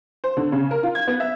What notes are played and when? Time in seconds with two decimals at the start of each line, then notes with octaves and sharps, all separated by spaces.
0.24 C5
0.37 D3
0.52 C#3
0.71 A#4
0.83 F4
0.95 G#6
1.07 B3
1.20 E5